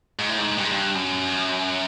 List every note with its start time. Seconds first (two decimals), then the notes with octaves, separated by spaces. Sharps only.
0.19 G#2
0.29 A2
0.38 G#2
0.58 G2
0.64 G#2
0.72 G2
0.95 F#2